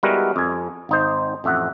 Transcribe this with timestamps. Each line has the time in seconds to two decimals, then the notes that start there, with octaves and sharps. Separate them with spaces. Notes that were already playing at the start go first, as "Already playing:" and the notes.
0.03 G3 G#3 B3 E4 F#4 A#4
0.36 F2 G#5
0.89 G#1 D#4 C5
1.44 A1 F2 E5 F#5